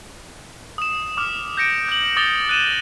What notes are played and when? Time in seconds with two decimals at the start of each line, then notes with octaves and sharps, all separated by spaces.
0.78 D#6 E7
1.17 D6 F6
1.57 G6 A#6 C#7 D7
1.89 G6 F#7
2.17 D6 D#6 A6 F7 G7
2.49 F#6 D#7 E7